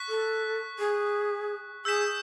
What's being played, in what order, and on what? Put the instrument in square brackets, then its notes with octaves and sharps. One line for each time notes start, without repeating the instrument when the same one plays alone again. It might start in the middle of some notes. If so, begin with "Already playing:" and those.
Already playing: [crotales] C#6 F#6 B6
[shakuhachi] A4
G#4
[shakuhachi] G#4 [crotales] E6 G6 B6 E7